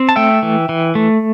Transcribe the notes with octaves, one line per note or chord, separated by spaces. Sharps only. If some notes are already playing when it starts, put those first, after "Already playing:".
Already playing: C4
A5
A3 E5 G5
E3
E3
A3